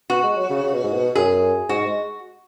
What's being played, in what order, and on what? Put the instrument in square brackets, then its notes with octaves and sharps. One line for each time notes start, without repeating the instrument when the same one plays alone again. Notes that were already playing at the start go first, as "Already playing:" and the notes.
[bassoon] B3 [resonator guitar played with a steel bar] F#4
[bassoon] G#3
F#3
C#3
C#3
B2
G#2
B2
[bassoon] F#2 [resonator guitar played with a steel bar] G#4
[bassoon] G#2 [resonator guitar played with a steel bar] F#4
[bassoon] G#3